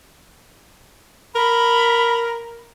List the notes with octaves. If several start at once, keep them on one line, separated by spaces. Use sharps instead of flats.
A#4 B5